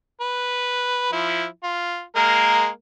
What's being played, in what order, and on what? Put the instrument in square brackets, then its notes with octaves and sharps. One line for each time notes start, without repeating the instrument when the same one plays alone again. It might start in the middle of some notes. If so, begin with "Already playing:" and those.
[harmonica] B4
F3 E4
F4
G#3 A#3 A#4